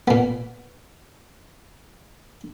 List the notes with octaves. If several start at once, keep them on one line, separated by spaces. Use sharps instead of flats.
A#2 B3